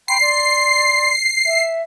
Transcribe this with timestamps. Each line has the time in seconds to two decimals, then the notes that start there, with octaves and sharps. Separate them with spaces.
0.08 G5 B5 C6 C7
0.21 D5 C6
1.46 E5